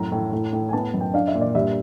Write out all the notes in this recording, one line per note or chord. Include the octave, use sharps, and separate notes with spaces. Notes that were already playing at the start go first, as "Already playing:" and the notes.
Already playing: F#2 A2 A#5
A2
A2
A2
G#5
B3 A5
F#2
G5
D4 F5
E5
A#2
D5
G2 E5